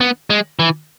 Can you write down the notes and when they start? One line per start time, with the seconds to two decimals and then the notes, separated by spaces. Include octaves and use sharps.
0.01 B3
0.30 G#3
0.59 E3